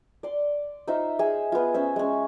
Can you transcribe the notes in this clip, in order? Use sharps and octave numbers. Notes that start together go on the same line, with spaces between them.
D5 C6
D#4 F4 C5 E5
G#4 E5
B3 F4
C#4 C5 E5
G#3 C#4